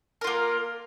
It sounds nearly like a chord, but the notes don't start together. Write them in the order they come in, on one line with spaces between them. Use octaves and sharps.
A#4 F4 A#3